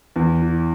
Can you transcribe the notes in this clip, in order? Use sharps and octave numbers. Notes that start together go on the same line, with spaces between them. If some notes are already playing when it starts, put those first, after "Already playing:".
E2
E3